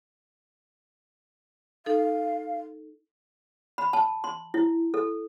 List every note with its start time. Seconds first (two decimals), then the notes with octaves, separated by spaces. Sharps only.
1.86 D#4 A4 F5
3.78 B5
3.93 A5
4.24 C6
4.54 E4
4.94 A4